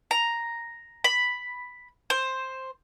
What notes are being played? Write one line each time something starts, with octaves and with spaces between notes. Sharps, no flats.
A#5
B5
C5